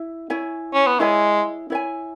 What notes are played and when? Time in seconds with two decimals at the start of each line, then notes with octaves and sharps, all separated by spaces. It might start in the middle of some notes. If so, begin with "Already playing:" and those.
Already playing: E4 E5
0.30 E4 C#5 E5 G#5
0.74 C#4
0.87 B3
1.00 G#3 E4 C#5 E5 G#5
1.70 E4 C#5 E5 G#5